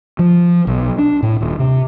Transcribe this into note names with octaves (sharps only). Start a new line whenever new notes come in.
F3
B1
D4
A2
D#1
C3